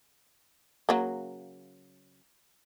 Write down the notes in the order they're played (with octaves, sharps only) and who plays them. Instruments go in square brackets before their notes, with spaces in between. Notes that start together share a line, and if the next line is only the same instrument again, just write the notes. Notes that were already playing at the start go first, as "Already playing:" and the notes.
[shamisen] C#3 F#3 A#3